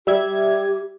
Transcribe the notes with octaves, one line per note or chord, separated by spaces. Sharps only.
G3 G4 E5 G#6